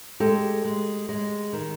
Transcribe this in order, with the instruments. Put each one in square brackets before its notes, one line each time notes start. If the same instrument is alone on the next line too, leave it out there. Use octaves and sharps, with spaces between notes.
[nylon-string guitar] G#3 G4 A4
G#3
G#3
D#3